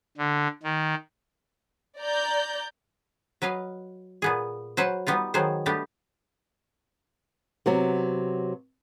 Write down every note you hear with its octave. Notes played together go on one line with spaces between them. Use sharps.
D3
D#3
D5 A#5 G6
F#3 B4 D#5 F5
A#2 B3 G#4
F#3 B4 C5 F#5
G3 B3 D#4 F4
D#3 F#3 G#3 B3 C5
G3 A3 B3 D4 G4
C3 F#3 B3